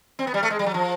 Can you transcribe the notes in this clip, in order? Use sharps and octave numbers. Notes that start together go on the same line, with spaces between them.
C4
B3
G3
A3
G#3
G3
F#3
F3